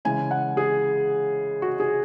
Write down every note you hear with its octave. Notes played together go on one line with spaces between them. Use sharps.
C#3 E3 G#3 G#5
F#5
G#4
F#4
G#4